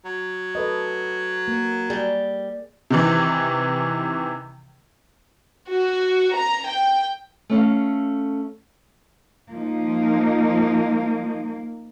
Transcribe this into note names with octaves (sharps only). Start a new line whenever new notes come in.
F#3
A4 B4 D#5
A#3
G3 G#4
C3 D#3 E3
F#4
A#5
G5
A3 C#4 A4 F5
F3 A#3 D#4